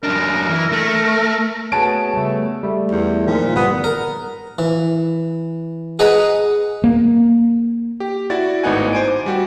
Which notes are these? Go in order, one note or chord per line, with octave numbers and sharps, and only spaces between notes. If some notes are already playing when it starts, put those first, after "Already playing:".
F#2 D4 A#4
E3
A3
A3 B3 F#4 G#4 B4 C#5 A5 D7
C#3 G3 A3
G3 A3
E2
A#2 D#3 F3
G1 G3 B3 D#6
A#4
E3
G#4 B4 D#5 F#5 A#5
A#3
G4
E4 F#4 D5 A6
G#1 A2 B3 D#4 F#5 G#5
C5 G#5 D7
D6
G3 F#4 G4